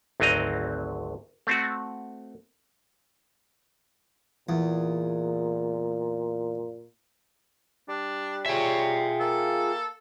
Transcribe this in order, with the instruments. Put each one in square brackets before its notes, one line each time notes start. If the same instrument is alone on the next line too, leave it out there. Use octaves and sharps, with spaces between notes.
[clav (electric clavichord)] G#1 D2 F#3 C4 D#5 A#5
A3 C4 F#4
[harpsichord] E2 [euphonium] A#2
[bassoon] G3 [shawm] D4
[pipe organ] F4 G#4 [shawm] C#5 [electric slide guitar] E5 G5
[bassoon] A#3 [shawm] A4